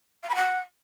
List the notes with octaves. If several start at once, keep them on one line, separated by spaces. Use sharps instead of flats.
F5
B5
F#5